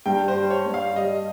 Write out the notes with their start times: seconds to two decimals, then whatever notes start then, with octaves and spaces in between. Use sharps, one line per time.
0.06 G2 G5
0.28 C5
0.35 G3
0.50 C#5
0.66 G2
0.74 F5
0.96 G3 D#5